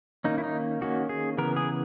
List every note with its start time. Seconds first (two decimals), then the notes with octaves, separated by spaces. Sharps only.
0.24 D#3 A#3 C#4 D#4
0.38 E4
0.44 D#4
0.81 D#3 A#3 C#4 F#4
1.09 G#4
1.38 C#3 E3 B3 A#4
1.56 G#4